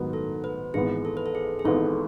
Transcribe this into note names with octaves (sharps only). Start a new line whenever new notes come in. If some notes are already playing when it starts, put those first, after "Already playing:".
Already playing: G#2 D#3 F#3 B3
A4
B4
G#1 G#2 E3 B3 G#4
A4
B4
A4
G#4
G#4
G#1 G#2 E3 B3 A4